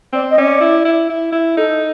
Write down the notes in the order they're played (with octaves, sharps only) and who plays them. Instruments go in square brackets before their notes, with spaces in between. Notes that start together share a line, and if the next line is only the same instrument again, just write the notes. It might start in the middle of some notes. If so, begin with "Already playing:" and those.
[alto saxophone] C4 [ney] D5
[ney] D#5
[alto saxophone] C#4 [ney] D5
[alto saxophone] E4
E4
E4
E4
[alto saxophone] D#4 [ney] A4